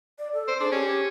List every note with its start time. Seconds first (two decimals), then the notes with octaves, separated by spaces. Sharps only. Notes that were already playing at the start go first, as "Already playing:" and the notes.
0.19 D5
0.34 A4
0.48 C5
0.60 D4 G#4
0.72 C#4 G4